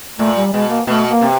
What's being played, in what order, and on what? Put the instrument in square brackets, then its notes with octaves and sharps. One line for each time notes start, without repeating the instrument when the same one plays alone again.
[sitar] A#2 [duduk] A3
[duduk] G3
[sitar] B2 [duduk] G#3
[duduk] A#3
[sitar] B2 [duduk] A3
[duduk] A#3
[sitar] C3